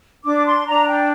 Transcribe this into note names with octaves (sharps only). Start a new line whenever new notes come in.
D4 D6
C6
D4 A#5
G5